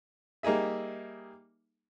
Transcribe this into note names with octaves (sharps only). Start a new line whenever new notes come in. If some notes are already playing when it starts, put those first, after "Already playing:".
G3 A#3 D#4 G#4 E5